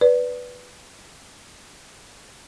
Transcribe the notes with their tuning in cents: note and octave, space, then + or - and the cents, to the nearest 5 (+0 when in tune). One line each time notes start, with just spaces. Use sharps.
B4 +0 D5 -10